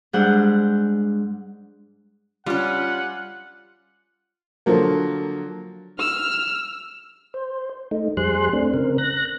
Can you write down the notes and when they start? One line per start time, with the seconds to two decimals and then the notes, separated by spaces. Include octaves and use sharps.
0.13 G#2 G3 D4 G#4 F#5 G6
2.46 G3 C#4 F4 F#5
4.66 D3 F3 F#3 A#3
5.99 E6 F6
7.34 C5
7.91 A3 D#4
8.17 F2 G3 G#4 C5 C6 F#6
8.53 A3 C4 D4
8.74 C#3 C4 A#4
8.98 F#6 A#6